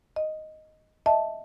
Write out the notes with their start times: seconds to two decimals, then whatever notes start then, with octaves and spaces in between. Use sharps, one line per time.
0.16 D#5
1.06 D#5 E5 A5